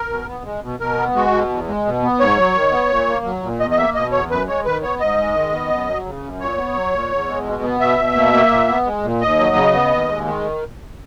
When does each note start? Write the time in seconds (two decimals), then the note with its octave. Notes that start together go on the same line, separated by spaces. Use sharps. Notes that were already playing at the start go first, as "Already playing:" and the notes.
Already playing: A#4
0.09 B2
0.27 B3
0.44 G#3
0.62 B2
0.80 B2 A#4
0.97 B3
1.15 G#3 F#4
1.32 B2
1.50 E2
1.68 G#3
1.85 B2
2.02 B3
2.19 G#2 C#5
2.38 F#3
2.55 D#3
2.72 B3
2.90 A#2
3.07 A#3
3.25 F#3
3.43 A#2
3.60 E2 D#5
3.71 D#5
3.77 A#3 E5
3.95 B2 D#5
4.12 E2 C#5
4.30 F#2 B4
4.48 G#3 C#5
4.65 D#3 B4
4.83 B3 C#5
5.00 G#2 D#5
5.18 G#3
5.35 D#3
5.53 B3
5.70 F#2
5.88 F#3
6.06 C#3
6.23 F#2
6.40 A#2 C#5
6.58 B3
6.75 F#3
6.93 A#2
7.11 E2
7.28 G#3
7.45 B2
7.63 B3
7.80 B2 E5
7.99 B2
8.15 A#3
8.34 A#3
8.51 A#2
8.68 B3
8.86 G#3
9.03 A#2
9.21 D#2 D#5
9.39 F#3
9.56 C#3
9.73 B3
9.91 D#2
10.08 G#3
10.25 D#3